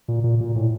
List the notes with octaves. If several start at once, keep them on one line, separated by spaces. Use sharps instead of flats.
A#2
A#2
A#2
A2